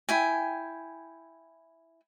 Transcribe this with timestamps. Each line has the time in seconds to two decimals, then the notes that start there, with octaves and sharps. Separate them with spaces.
0.09 E4 G5 G#5